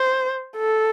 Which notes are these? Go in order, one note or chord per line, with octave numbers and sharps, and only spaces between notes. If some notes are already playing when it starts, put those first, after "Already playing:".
Already playing: C5
A4